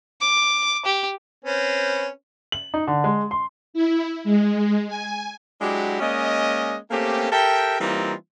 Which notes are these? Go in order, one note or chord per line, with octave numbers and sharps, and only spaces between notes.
D6
G4
C4 C#4 B4
F#7
D#4
D3
G#3
C6
E4
G#3
G#5
F#3 G#3 D4 E4 F#4 G4
G#3 A#3 C#4 D5 D#5
A3 A#3 C4 C#4 G4
G4 A4 A#4 E5 G5
E3 G3 A#3 C4 D#4 F4